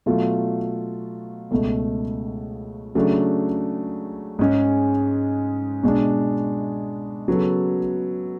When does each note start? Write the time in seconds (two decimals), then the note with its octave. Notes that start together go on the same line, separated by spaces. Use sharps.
0.06 B2 F#3 A3 F4
1.51 C#2 B2 A3
2.95 C#3 F#3 A3 D4
4.39 G#2 G#3 C#4
5.83 B2 G#3 D4
7.28 C#3 F#3 B3 F#4 A4